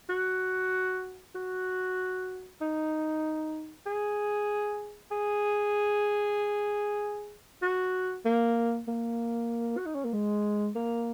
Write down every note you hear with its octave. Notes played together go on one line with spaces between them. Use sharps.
F#4
F#4
D#4
G#4
G#4
F#4
A#3
A#3
F#4
D#4
C#4
A#3
G#3
A#3